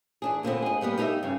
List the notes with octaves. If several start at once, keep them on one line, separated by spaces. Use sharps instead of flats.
E3 D4 G#4
A#2 D3 B3 C4
G#4 D#5
G3 A#3 B3 G4
D#4 G4 G#4 C#5 D#5 E5
G2 C#3